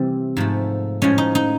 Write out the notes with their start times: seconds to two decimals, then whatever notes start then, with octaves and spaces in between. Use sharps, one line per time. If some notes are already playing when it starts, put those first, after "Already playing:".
Already playing: C3 E3 G3 C4
0.37 G#2 F3 A3
1.02 A2 F3 G#3 C#4
1.18 D#4
1.35 D#4